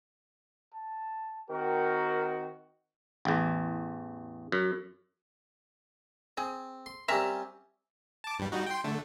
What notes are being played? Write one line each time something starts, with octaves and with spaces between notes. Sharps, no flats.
A5
D#3 C4 F#4 A#4
A1 E2
F#2
C4 G#4
C6
G3 C4 C#4 A#4 E5 A#5
A5 D6
G2 G3
G3 D#4 F#4
G5 C6
D3 A3